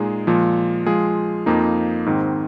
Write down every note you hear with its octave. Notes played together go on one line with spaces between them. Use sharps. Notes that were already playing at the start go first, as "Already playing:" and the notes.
Already playing: A#2 G#3 D#4 G#4
A#2 F3 G#3
F3 G#3 F4 G#4
F2 F3 A#3 D#4
G#2 D#3 C4